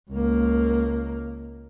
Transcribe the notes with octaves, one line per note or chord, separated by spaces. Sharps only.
C#2 A#3